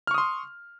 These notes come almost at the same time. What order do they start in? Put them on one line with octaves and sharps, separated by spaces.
F6 C#6 D#6 C6